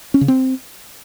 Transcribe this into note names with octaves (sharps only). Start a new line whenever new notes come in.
C#4
C#3
C4